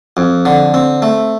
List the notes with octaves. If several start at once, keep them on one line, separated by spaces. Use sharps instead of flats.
F2
D3
C4
A3